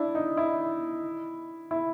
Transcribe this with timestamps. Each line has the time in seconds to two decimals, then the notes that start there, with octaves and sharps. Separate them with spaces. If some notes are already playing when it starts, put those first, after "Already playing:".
Already playing: D4 E4
0.15 D#4
0.37 E4
1.71 E4